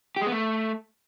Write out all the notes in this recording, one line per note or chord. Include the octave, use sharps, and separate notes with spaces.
G4
G#3
B3
A3